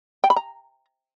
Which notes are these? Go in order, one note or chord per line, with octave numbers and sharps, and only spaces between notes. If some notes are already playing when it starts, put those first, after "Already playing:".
G5
B5
A#5